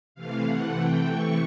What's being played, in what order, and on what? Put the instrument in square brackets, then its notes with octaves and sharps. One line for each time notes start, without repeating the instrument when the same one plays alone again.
[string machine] C3 E3 A3 F5
F#5
G5
C#6